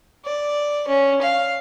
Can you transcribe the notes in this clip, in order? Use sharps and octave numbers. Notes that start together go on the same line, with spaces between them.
D5
C#4
F5